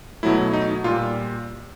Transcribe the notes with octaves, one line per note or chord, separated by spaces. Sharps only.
B2 F#3 A3 E4
D#4
A#2 G3 F4